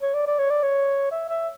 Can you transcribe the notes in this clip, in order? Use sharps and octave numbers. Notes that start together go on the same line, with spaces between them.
C#5
D5
D5
C#5
D5
C#5
E5
E5